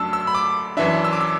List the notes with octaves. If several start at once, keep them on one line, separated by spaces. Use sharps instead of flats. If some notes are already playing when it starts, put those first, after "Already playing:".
Already playing: F#2 F#3 A3 D4 A5 E6
E6
B5
D6
F#2 E3 D4 E5
E6
D6
E6